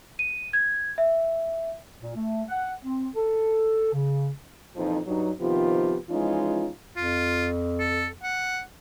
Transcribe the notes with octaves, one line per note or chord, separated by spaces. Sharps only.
D#7
G#6
E5
A#2
A3
F#5
C4
A4
C#3
F2 A#2 E3 F3 D#4
G2 F#3 D#4
C3 D#3 F3 B3 F4 G4
E3 F3 G#3 C#4 D#4 F4
F2 F4
A4
F#5